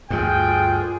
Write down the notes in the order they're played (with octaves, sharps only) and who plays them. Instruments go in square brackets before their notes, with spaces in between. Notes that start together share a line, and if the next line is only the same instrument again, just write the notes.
[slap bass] D2 G2 [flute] F4 [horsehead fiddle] G#4 [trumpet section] G5